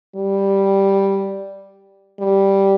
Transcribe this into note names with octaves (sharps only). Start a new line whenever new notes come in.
G3
G3